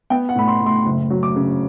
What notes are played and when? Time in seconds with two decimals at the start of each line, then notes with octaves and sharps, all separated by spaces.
0.10 B3 G5
0.29 F#5
0.35 A2 B5
0.48 C6
0.61 A2
0.66 C6
0.85 F#1
1.10 F#3
1.23 D6
1.36 C#3